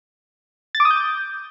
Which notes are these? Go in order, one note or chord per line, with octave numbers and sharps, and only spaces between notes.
A6
D6
D#6
G6